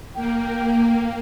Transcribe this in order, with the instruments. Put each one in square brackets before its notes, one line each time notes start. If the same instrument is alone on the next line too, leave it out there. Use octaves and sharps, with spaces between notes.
[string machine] A#3 [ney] G5